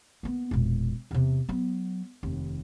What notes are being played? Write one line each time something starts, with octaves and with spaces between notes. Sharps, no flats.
A#3 B3
E1 A#2
E2 C3
F#3 B3
F1 D#2